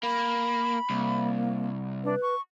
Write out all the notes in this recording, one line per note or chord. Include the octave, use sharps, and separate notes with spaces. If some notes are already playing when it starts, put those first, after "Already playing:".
A#3 B5
C2 A#3
D4 B4
C#6